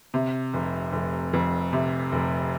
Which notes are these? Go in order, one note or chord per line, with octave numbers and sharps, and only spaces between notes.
C3
F1
F1
F2
C3
F1